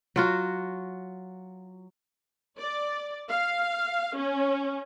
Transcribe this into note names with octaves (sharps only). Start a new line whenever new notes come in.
F#3 F4 F#4
D5
F5
C#4